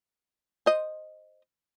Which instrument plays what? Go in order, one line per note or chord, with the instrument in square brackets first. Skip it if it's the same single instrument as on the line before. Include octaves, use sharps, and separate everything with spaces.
[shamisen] C5 D#5